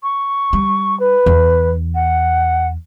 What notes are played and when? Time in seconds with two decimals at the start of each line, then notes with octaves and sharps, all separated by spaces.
0.03 C#6
0.53 G3
1.00 B4
1.26 E2
1.95 F#5